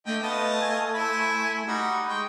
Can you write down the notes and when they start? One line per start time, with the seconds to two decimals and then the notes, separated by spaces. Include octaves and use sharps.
0.06 D3 A3 D#5 G5
0.22 B3 F4 D#5 A5
0.62 G#5
0.95 E4 C5 B5
1.68 G3 D#4 F#4 B5
2.09 G#3 G5 C#6